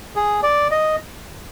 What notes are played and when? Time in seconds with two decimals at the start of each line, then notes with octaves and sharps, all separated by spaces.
0.16 G#4
0.43 D5
0.71 D#5